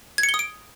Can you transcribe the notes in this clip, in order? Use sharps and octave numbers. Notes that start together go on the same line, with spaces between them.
G#6
C#7
G7
D#6
D7